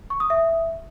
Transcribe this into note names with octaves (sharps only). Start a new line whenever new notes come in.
C#6
D#6
E5